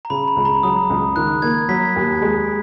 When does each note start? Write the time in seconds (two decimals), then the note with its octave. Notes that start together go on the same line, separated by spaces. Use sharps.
0.05 A#5
0.10 C#3 B5
0.28 B5
0.36 C#2
0.45 A#5
0.63 F#3 D#6
0.90 C#2
1.16 D#3 F#6
1.42 A#3 G#6
1.69 F#3 B6
1.96 D#2
2.22 G#3